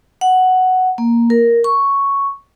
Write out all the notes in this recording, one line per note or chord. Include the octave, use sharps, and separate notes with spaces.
F#5
A#3
A#4
C#6